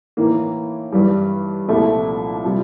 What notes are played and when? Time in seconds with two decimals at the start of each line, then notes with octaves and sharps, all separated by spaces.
0.17 A2 E3 A#3
0.92 G2 E3 G3
1.68 C2 A#2 F3 A3 E4
2.44 C3 G3 C4 F4